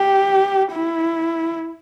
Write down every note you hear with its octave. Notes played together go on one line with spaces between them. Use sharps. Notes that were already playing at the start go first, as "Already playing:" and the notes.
Already playing: G4
E4